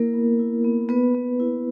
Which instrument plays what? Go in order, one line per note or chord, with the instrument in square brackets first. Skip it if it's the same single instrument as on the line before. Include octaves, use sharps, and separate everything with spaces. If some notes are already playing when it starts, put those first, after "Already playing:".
Already playing: [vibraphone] A#3 E4 A#4
B3
E4
B3
B3 B4
B3
E4